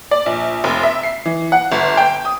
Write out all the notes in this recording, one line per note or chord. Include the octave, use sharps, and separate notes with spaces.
D5
A#1
F1
E5
C7
E3
F#5
G1
G5
D#6